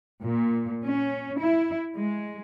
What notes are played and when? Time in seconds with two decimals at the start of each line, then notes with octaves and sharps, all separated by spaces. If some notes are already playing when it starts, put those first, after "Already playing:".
0.23 A#2
0.85 C#4
1.39 E4
1.96 G#3